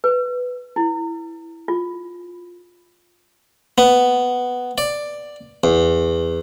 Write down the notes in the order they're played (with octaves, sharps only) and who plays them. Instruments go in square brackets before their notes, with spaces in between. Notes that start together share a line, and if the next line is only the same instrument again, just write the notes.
[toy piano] B4
E4
F4
[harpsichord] B3
D5
E2